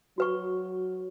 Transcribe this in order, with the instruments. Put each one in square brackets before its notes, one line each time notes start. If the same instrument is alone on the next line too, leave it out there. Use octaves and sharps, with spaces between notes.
[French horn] F#3 [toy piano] F#4 B4 C#6